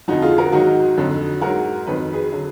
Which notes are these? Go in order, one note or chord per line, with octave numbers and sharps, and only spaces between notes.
F2 D3 F3 D#4 F#4
F4 G#4
F#4 A#4
G#2 D#3 F#3 D#4 F#4
F2 D3 F#3
G#2 F#3 F#4 A#4
F2 D#3 F#3 B4
G#4 B4
D3 F#3